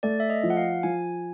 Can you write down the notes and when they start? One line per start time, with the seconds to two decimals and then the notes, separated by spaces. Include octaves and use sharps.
0.03 A3 D5
0.20 E5
0.30 D#5
0.43 F3
0.50 F#5
0.57 F5
0.83 F3 G#5